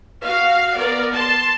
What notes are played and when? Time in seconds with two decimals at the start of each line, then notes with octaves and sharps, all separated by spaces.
0.24 F#4 F5
0.76 B3 A#4 D5
1.13 A5 C6